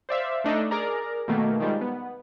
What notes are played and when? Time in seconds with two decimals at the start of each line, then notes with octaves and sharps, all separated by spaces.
0.09 C5 D5 E5 F5
0.44 A3 D4 D#4 A4
0.71 G#4 A#4 D5 A#5
1.28 B2 D#3 A3 A#3
1.60 D#3 F3 G3 G#3
1.81 B3